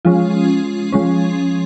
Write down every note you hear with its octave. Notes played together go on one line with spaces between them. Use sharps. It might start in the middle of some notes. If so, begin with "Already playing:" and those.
F3 G#3 C#4 F4
F3 G#3 C#4